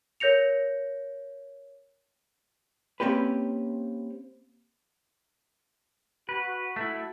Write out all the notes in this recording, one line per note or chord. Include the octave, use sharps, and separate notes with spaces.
A#4 C#5 G6 A#6 C#7 F7
A#3 C4 C#4 G4 B4
F#4 B4
A3 E4